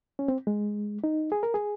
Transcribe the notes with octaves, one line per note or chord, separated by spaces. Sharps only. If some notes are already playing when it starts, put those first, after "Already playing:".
C#4
C4
G#3
D#4
G#4
A#4
G#4